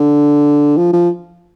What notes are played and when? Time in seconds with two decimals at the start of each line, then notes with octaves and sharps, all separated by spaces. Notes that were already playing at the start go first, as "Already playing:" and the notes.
Already playing: D3
0.77 F3
0.93 F3